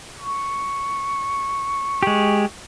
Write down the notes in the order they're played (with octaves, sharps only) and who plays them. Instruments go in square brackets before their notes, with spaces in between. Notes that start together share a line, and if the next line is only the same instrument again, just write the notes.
[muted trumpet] C#6
[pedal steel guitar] G#3 G4